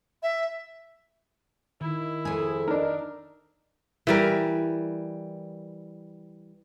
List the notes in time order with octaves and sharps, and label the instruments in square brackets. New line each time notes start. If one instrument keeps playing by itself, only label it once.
[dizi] E5
[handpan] D#3 [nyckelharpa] E4
[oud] F2 G#4
[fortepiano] D4 A#4 [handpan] D#4
[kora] E3 G3 A#4